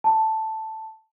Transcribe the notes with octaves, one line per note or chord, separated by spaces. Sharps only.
A5